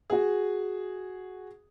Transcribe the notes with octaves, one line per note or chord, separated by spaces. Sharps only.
F#4 G#4